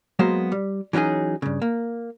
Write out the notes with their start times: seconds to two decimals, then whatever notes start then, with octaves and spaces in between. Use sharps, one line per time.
0.19 F#3 G#3 A#3 B3 A#4 C5
0.52 G3
0.93 E3 F#3 C#4 D#4 G#4
1.42 G2 C#3
1.62 A#3